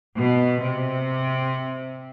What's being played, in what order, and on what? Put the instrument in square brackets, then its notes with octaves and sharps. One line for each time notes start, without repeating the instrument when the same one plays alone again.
[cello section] B2
C3